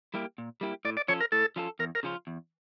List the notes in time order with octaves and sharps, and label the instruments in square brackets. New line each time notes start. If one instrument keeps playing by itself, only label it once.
[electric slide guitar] G3 A#3 E4 G4
A#2
G3 A#3 E4 G4
[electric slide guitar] A2 [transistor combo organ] D5
[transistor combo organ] D5
[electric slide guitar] F3 C#4 F4 A4 [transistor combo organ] C#5
[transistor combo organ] A#4
[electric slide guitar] A2 [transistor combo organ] A4
[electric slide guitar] F3 C#4 F4 A4
[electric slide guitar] E2 [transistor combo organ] A#4
[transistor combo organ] A#4
[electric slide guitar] C#3 F3 C#4 F4
E2